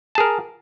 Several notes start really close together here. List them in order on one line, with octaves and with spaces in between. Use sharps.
A5 G#4 A#4